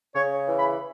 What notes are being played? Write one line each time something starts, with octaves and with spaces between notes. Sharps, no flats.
C#3 C#5
E3
B5